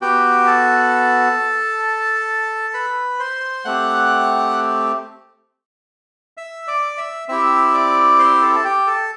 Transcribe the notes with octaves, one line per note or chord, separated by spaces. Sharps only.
B3 F#4 G4 G5
A4 A5
B4 B5
C5 C6
A3 C4 G4 F#5 F#6
E5 E6
D5 D6
E5 E6
C4 E4 G4 E5 E6
D5 D6
C5 C6
A4 A5
A5
G4 G5
A4 A5